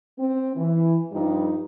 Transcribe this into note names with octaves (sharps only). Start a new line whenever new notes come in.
C4
E3
G2 F3 G3 D#4